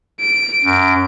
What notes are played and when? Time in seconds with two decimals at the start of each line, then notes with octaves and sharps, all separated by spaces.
0.20 D7
0.64 F#2